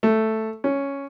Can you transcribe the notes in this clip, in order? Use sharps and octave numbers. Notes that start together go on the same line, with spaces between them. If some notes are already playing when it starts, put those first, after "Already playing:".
A3
C#4